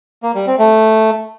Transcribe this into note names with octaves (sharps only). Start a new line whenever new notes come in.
A#3
G3
C4
A3